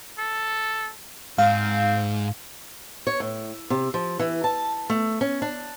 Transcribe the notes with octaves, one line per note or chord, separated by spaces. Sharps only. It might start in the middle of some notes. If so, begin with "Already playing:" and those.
A4
G#2 C4 F5
C#5
A2
C3
F3
E3
A5
A3
C#4
D4